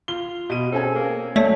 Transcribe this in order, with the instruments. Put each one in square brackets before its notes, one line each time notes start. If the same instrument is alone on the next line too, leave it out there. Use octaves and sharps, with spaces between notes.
[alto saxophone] F4 [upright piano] G7
[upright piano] B2 D#7
[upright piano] C4 C#4 G#4 [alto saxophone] A4
[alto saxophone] A#3
[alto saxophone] F#3 [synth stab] A3 [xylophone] C#5 D5 B6